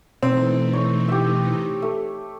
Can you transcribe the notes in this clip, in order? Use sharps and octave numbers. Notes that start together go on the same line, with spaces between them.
B2 E3 A3 C4 D#4 E6
C#5
G4 E5
A3